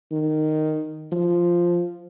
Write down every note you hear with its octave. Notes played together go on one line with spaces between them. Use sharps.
D#3
F3